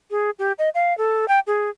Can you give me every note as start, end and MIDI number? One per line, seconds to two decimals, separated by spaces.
0.11 0.30 68
0.39 0.52 67
0.59 0.70 75
0.75 0.96 77
0.98 1.28 69
1.28 1.40 79
1.47 1.70 68